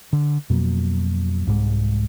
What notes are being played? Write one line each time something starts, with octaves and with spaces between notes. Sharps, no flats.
D3
F2 B2 F#3 A#3
C2 G#2 G#3